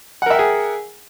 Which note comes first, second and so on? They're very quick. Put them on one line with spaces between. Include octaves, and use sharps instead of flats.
F#5 A#4 E5 G5 G#4